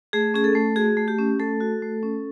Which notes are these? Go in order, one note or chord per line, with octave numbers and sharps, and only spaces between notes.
A3 G#4
C#4 G#4
A4
A3
F#4 G#4
A3
G4
C#4
A3 A4
F#4
A3
C#4